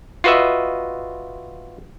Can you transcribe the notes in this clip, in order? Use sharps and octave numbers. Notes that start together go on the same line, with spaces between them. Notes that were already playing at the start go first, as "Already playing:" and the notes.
F4 F#4 B4 D#5 E5